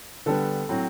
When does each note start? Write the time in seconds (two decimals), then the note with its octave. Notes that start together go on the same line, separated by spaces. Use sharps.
0.26 D3 G3 B3 A4
0.69 A2 F#3 C4